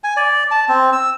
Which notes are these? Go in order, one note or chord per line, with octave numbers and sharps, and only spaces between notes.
G#5
D5
A5
C4
E6